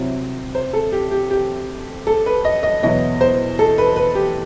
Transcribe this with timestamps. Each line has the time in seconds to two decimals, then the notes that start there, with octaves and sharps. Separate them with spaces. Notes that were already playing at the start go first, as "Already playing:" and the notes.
Already playing: C3 F#3 C4 E4
0.55 C5
0.73 A4
0.92 G4
1.11 G4
1.31 G4
2.07 A4
2.26 B4
2.45 D#5
2.63 D#5
2.82 E2 B2 F#3 B3 E4 D#5
3.21 C5
3.59 A4
3.78 B4
3.96 B4
4.15 G4